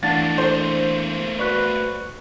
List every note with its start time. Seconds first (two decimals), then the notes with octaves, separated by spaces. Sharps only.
0.03 E3 A3 A#3 D4 F5 F#5 A5 A6
0.38 A4 C5
1.39 F#4 B4 D5 C#6 F#6